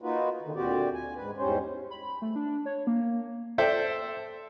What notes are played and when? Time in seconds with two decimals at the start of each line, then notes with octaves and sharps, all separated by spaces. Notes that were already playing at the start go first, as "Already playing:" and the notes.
0.02 A#3 D#4 F4 F#4 B4
0.42 D3 D#3
0.55 D2 A#2 C4 F#4 G4 D5
0.94 G#5
1.16 G#2 B4
1.37 E2 G#2 G3 C#4 C5
1.91 B5
2.22 A3
2.36 D4
2.66 C#5
2.87 A#3
3.58 A4 C5 D5 E5 G5